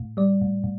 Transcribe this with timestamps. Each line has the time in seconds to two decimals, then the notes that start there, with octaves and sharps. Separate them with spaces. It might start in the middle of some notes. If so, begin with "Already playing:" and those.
Already playing: A2
0.17 G3 D5
0.41 A2
0.64 A2